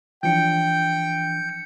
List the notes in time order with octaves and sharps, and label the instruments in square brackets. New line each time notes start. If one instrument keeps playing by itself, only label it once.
[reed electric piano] E3 F3 D4 [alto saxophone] G5 [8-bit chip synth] G6 C#7